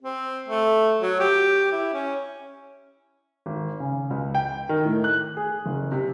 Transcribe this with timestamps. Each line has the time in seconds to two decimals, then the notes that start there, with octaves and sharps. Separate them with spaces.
0.02 C4
0.48 A3
1.00 F#3
1.20 G4
1.72 E4
1.94 C#4
3.46 G#1
3.80 C#3
4.10 C#2
4.35 G5
4.69 D#3
4.85 A2
5.04 F#6
5.37 G#4
5.66 F#1
5.92 C3